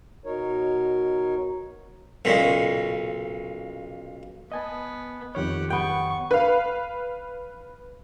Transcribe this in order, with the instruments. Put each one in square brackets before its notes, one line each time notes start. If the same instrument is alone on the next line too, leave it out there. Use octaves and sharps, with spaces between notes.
[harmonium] B2 D#4 A#4 C#5
[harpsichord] B1 A#2 C#3
[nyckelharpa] B3 [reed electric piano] D#5 G#5 A5
[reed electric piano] F2 D#3 C#5 [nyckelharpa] G4 F#5
[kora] B3 G5 [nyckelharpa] C#6
[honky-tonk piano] B4 F5